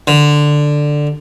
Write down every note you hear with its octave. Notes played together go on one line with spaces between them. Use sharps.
D3